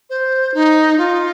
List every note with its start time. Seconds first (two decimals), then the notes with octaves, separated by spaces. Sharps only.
0.10 C5
0.54 D#4
0.98 F4